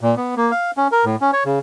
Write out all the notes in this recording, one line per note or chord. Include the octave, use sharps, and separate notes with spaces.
A#2
B3
A#3
F5
C#4
A#4
A2
C#4
C#5
C#3